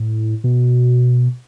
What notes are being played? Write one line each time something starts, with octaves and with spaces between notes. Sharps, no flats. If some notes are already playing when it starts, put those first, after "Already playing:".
Already playing: A2
B2